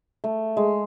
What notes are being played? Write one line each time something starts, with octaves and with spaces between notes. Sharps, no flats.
A3
G#3